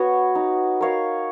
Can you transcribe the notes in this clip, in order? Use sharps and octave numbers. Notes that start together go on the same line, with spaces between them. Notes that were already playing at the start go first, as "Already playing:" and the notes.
Already playing: B3 F#4 C#5
D#4
A#4 C#5 F5